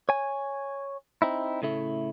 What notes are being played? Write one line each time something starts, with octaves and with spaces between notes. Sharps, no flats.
C#5 G#5
C4 D#4 E4
A2 C#3 A3 E4